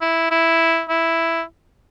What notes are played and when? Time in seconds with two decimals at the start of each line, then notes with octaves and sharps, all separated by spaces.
0.01 E4
0.31 E4
0.89 E4